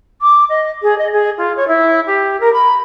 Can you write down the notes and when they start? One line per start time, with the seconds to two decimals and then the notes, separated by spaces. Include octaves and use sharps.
0.22 D6
0.50 D#5
0.82 G#4
0.98 D#5
1.12 G#4
1.38 F4
1.57 C#5
1.68 E4
2.07 G4
2.40 A#4
2.53 B5